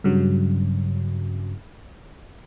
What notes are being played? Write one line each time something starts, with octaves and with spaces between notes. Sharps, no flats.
G2 C#3 F#3